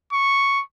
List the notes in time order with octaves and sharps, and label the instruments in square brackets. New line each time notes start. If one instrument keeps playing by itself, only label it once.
[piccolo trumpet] C#6